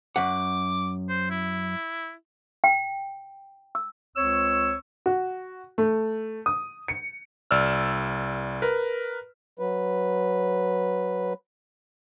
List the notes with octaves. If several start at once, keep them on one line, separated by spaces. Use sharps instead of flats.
F#2 F#5 D6
C5
E4
G5
E6
C#2 C4 C#5 C#6 E6
F#4
A3
D#6
C#7
C2 D5 E6 F6
A#4 B4
F#3 B4